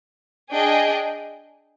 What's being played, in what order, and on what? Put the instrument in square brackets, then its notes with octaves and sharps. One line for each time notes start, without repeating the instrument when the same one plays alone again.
[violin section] D4 G#4 D#5 G5